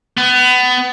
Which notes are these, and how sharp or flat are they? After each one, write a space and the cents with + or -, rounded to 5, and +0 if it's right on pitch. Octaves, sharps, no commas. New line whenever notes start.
B3 +25